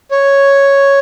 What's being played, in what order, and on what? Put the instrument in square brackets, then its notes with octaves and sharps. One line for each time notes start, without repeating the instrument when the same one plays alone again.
[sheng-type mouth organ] C#5